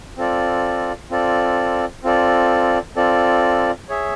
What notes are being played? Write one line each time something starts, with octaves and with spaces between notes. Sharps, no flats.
C4 F4 A4 D5
C4 F4 A4 D5
C4 F4 A4 D5
C4 F4 A4 D5
G#4 C#5 E5